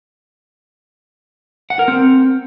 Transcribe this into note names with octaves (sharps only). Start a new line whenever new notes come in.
F#5
A#4
C4